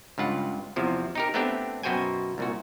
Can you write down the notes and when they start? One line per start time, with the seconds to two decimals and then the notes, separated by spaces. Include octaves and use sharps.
0.18 C#2 G2 F4 F#5
0.76 E2 C3 F3
1.15 D#4 G4 A#4
1.34 A3 B3 C4 D4 G4
1.83 F#2 B2 F#4 C5 G5 G#5
2.38 C2 A#2 F#4